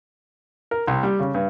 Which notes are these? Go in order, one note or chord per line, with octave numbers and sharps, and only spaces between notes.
A#4
C2
G3
C#3
G2